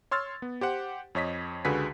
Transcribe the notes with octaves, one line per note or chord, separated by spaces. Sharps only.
C#5 C6 E6 F6 A6
B3
G4 C5 F#5
F2 C#5 D#5 B6
C#2 D3 F#4 G#4 B4 B6